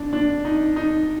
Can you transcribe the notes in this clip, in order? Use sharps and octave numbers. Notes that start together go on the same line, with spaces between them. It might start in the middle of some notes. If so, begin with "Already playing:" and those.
Already playing: F2 D4
D4
D#4
D#4